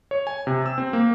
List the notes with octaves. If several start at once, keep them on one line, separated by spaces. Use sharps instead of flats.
C#5
G#5
C3
E6
C4
A#3